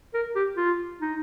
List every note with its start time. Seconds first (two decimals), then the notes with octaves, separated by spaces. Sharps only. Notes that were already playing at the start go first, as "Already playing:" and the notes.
0.14 A#4
0.35 G4
0.57 F4
1.01 D#4